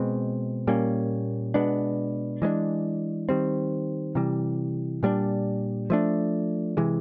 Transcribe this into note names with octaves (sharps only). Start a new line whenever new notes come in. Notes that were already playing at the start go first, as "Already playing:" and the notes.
Already playing: B2 G#3 C4
A#2 G3 A#3 C#4
B2 G#3 B3 D4
E3 G#3 B3 D4
D#3 G3 C4
C3 E3 G3
A#2 G3 B3 D4
F3 A3 D4
C3 E3 G#3